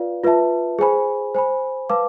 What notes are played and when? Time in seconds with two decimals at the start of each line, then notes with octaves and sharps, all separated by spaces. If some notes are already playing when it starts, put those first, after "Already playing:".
Already playing: F4 B4 D5 F5
0.24 F4 B4 E5 A5
0.79 G#4 C5 G#5 B5
1.35 C5 G#5 B5
1.90 B4 F5 A5 D6